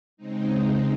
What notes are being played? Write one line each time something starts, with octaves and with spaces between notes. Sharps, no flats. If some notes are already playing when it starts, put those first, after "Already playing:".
C#3 G#3 C4 D#4
D#4